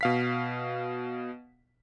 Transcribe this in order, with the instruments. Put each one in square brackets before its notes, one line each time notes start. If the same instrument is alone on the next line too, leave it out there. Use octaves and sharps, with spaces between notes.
[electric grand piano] B2 F5 B6